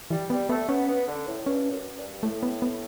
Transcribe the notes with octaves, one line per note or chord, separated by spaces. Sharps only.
E3 G3
G3 B3
A3 B3
B3 C#4
B3
D3
A2
G2 C#4
F#2
G2
A2 A3
B3
B3